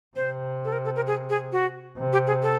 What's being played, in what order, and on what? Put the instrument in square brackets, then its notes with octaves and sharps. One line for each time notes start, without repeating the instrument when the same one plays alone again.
[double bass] C3 [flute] C5
[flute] A4
A#4
A4
A#4
G#4
G#4
F#4
[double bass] C3
[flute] G4
G#4
A4